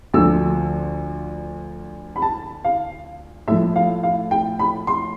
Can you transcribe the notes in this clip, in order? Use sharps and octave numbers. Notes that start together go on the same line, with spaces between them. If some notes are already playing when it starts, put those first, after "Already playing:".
D2 D3 F3 E6
B5
A5
F5
A2 F3 E5
F5
F5
G5
B5
C6